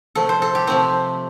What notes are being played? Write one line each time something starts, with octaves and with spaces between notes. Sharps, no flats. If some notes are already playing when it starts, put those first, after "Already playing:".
C3 F3 A3 A4
C5
A4
G4
C3 F3 A3 C4